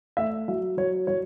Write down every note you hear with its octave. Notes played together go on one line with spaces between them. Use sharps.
A3 E5
F#3 E5
F#3 C#5
F#3 C#5